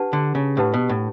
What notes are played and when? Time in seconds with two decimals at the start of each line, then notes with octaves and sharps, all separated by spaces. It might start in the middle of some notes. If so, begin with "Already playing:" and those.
Already playing: D4 G4 B4 F#5 A5
0.13 D3
0.35 C#3
0.57 A2 D4 G4 B4 F#5 A5
0.74 B2
0.89 A2